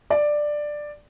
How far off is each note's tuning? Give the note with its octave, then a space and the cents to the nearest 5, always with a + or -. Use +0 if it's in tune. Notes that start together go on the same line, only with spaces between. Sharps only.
D5 +10